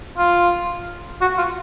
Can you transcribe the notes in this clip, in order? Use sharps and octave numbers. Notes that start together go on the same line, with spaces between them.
F4
F#4
F4